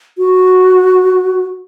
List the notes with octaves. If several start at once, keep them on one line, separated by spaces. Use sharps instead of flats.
F#4